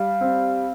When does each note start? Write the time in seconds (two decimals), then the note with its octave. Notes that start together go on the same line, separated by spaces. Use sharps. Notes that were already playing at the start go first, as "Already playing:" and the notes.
Already playing: G3 F5
0.21 C4